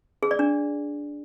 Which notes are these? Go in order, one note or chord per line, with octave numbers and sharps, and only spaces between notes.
G#4
D5
D4